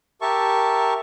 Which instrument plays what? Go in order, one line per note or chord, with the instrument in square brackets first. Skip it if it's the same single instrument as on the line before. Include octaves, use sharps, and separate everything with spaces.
[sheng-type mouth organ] G4 A#4 E5 A5 C#6